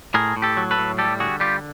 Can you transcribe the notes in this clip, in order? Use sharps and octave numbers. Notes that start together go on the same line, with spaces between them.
A2 G#4 A#4
A2
G4 A4
F#3
A4 B4
A2
G3 G4 A4
D3 F#4 G#4
G3 F4 G4